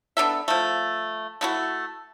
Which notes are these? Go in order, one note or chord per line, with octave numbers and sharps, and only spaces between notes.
B3 D4 A4 E5
F3 A3
A3 E4 F#4